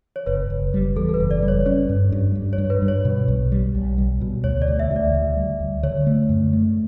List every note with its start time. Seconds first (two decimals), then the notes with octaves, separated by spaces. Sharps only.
0.16 C#5
0.26 F#1 B4
0.50 F#1
0.74 G3
0.96 E2 A4
1.09 A4
1.14 B4
1.20 F#1
1.31 D5
1.43 G3
1.48 C#5
1.66 C#4 C#5
1.89 G2
2.12 G2
2.35 G2
2.53 C#5
2.58 G2
2.70 B4
2.82 G2
2.88 C#5
3.05 B2
3.28 B1
3.52 G3
3.75 B1
3.98 G3
4.21 B2
4.44 D2 C#5
4.62 D5
4.68 D2
4.79 E5
4.91 D2
4.96 D5
5.14 D2
5.37 G3
5.60 D2
5.83 D3 C#5
6.07 A3
6.29 F#2
6.53 A3